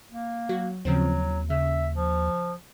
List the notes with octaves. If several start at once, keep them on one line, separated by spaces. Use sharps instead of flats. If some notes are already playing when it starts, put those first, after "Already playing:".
A#3
F#3 F#4
D#2 C#3 F3 F#3 C4
C#3 E5
F3